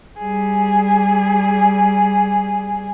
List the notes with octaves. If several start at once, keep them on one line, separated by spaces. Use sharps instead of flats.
G3 G#4